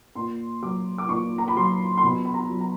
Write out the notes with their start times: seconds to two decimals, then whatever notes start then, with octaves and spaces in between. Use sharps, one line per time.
0.15 A#2 C6
0.62 F#3 D6
0.98 D6
1.09 A#2 C#6
1.38 A#5
1.48 B5
1.56 F#3 C6
1.98 C6
2.03 B2 B5
2.25 B5
2.34 A#5
2.50 F#3
2.60 A#5